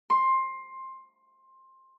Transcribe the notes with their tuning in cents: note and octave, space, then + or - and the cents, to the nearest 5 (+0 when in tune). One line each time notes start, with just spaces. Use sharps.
C6 +15